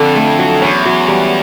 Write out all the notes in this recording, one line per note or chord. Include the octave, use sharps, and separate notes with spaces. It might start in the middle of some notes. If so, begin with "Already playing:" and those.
Already playing: F2 D3 D4
A3
F#3
E2 C#4
F#3
G3